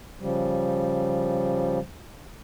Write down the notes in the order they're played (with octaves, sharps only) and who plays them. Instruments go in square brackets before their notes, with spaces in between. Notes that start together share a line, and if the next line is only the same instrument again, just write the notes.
[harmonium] C#3 F3 G3